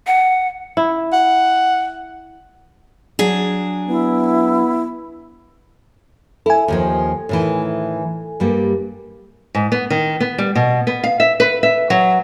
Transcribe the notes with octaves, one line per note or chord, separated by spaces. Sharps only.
F#5
E4
F#5
F#3 D4 G#4
B3 E4
E4 A4 G#5
D#2 D#3 F3
A2 D#3 E3
G2 G3 A#3
G#2
B3
D#3
B3
G3
B2
B3
F5
E5
B4
E5
F#3